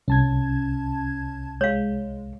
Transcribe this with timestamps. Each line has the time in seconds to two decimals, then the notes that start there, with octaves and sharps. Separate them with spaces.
0.08 C2 C#4 A5 G#6
1.61 G#3 C#5 F5